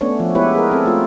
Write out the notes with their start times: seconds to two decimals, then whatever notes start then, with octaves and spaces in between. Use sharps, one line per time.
0.01 A3 B3 C#4 D4 C#5
0.20 F3
0.35 G#3 B3 E4 G4 B4 C#5
0.55 G#4 A#4
0.72 C4 A4
0.85 A3 F4